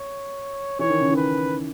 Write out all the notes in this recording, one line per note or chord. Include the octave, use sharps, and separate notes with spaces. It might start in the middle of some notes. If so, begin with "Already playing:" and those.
Already playing: C#5
E3 C#5
D#3
C#3
D#3
B4